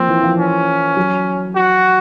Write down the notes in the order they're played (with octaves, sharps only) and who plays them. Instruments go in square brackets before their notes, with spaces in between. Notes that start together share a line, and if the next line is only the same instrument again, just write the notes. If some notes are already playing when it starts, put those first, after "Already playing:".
Already playing: [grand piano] F3 A#3 [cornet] C4
[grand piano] E3
F3
[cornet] C#4
[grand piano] F#3
[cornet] F#4